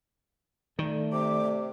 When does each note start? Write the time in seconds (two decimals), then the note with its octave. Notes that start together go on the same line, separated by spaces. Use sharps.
0.79 D#3 A3 D5
1.12 C3 D6